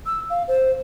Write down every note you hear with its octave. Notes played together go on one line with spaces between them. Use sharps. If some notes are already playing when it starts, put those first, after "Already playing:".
E6
F5
C5